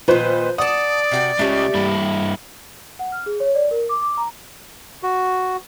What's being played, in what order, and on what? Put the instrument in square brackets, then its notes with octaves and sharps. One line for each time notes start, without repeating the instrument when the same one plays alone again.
[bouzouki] A#2 D#3 [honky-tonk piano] F3 B4 C5
[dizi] D5 [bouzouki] F#5 A5 [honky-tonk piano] D#6
[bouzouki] C3 F#4 G5
[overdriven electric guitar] C#3 G#3 [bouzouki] A3 G4
[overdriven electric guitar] G2 E4
[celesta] F#5
F6
G#4
C#5
D5
A#4
D6
D6
A#5
[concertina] F#4